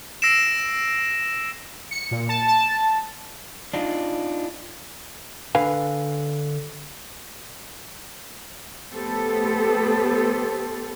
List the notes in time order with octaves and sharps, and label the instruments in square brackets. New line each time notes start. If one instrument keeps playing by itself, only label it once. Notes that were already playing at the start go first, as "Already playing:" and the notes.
[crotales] E6 A#6 C7 D7 E7
[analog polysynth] C#7
A#2
A5
A5
[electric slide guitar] D4 D#4 F4
[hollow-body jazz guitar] D3 B4 F5 G#5
[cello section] A3 B3 G4 A4 C5